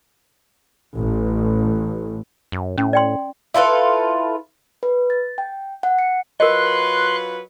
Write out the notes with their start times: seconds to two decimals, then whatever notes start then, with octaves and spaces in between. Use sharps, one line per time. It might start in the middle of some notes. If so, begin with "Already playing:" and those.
0.96 A1
2.52 F#2
2.78 A2 C#4
2.93 D5 G5 C6
3.54 E4 F4 A4 B4
4.83 B4
5.10 A6
5.38 G5
5.83 F#5
5.99 C#7
6.40 F#3 F4 A#4 B4 D#5 C6 F#6